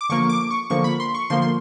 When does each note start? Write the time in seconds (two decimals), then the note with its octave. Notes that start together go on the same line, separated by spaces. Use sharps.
0.01 D6
0.09 D3 F3 A#3 C#6
0.29 D6
0.51 C#6
0.70 D3 F3 A#3 C#6
0.84 B5
1.00 C6
1.15 C#6
1.30 D3 F3 A#3 C6
1.42 C6